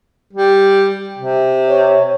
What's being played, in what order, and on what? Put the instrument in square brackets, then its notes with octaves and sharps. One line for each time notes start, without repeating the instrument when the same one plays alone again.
[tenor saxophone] G3
C3
[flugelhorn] C#5